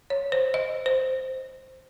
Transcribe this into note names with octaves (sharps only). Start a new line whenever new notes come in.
C#5
C5
D#5
C5